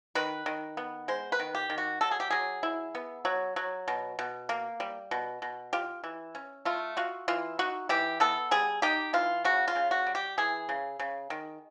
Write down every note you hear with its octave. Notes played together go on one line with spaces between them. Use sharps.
D#3 B4
D#3
B3
G#3 C5
B4
D#3
G4
D#3
F#4
F#3 A4
G#4
G4
F#3 G#4
E4
B3
F#3
F#3
B2
B2
A#3
G3
B2
B2
F4 G4
E3
C#4
A3 F4
F4 F#4
E3 F4
D#4 F#4
E3 G4
B3 A4
G3 G#4
D#4 G4
E3 F4
C#3 F#4
F4
C#3
F#4
G3
G4
E3 G#4
C#3
C#3
D#3